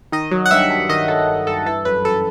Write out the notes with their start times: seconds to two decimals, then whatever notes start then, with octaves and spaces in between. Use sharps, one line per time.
0.12 D#3 D#5
0.31 F#3
0.46 F#5
0.51 G2 E5
0.70 G2
0.89 D#3 D#5
1.08 F#3 A4
1.28 G2
1.47 G2 A4
1.66 E3 A4
1.85 F#2 B4
2.05 F#2 A4